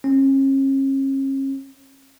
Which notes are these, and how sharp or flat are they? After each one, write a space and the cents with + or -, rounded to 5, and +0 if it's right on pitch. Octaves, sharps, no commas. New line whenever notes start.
C#4 -40